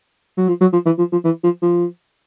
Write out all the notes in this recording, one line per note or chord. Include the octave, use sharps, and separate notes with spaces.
F#3
F3
F#3
F3
E3
F3
F3
E3
F3
F3